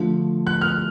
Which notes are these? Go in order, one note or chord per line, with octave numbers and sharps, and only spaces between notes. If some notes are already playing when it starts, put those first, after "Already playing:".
Already playing: D3 F3 A3
F#6
F6